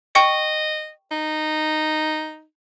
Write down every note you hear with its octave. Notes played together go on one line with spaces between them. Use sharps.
D#5 G5 C#6 C#7
D#4